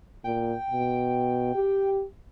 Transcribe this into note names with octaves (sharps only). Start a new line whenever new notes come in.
A#2 G5
B2
G4